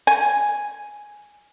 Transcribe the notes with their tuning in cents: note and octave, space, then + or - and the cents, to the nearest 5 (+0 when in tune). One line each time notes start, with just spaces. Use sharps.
G#5 +0